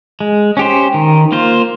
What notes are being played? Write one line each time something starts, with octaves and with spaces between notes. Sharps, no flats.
G#3
C#4 G4 C5
D#3
A#3 F4 C5